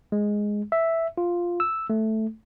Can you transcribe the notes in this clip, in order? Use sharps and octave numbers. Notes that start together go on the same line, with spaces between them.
G#3
E5
F4
E6
A3